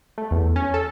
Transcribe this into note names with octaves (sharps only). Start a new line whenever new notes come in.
A3
E2
C#4
A4